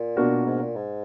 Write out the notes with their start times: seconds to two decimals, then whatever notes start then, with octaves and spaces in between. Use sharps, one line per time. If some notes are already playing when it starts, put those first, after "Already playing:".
Already playing: A#2
0.17 B2 A#3 D4 F#4 A#4
0.46 G#2
0.61 A#2
0.75 G#2